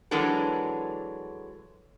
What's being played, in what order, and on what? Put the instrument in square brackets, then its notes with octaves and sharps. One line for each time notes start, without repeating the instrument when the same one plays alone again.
[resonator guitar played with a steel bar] E3 F#3 G#3 D4 A4 A#4